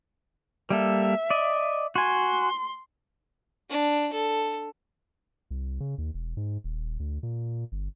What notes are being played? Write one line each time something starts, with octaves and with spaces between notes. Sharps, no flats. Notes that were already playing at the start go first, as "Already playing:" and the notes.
G3 A#3 A4 E5
D5 D#5
F#4 G#5 C6
D4
A4
C2
C#3
D#2
E1
G#2
D#1
D2
A#2
G1